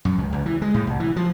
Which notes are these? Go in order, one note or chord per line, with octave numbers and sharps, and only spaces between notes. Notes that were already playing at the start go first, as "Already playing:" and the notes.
F#2
C#2
C#2
E3
G#3
A2
C2
E3
F3